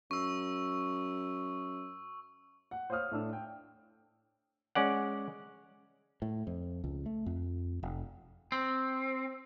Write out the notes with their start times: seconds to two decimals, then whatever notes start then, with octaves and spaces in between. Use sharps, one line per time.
0.11 F#2 C#6 E6
2.71 F#5
2.90 C5 C#5 F5 D#6 F6
3.12 A2 D4 E6
3.33 G5
4.75 G#3 C#4 D5 F#5
6.22 A2
6.47 F2
6.84 C#2
7.06 A3
7.26 F2
7.83 F1
8.52 C4